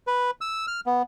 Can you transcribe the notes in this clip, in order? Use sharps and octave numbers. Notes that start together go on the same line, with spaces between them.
B4
E6
F6
B3